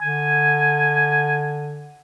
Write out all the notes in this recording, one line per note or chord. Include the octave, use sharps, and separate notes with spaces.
D3 G#5